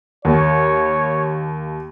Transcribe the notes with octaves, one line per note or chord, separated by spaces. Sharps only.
D#2 C#5